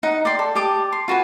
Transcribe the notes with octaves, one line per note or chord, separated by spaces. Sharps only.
D#4 F#5
D5 G5 C6
A4
G4 A5 D6 D#6
C6
F4 F#4 B4 G#5